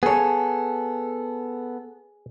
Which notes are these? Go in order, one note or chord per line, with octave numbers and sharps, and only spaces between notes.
B3 G#4 A4 C#5